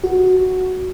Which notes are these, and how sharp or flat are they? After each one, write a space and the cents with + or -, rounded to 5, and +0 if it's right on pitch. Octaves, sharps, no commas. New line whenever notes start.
F#4 +0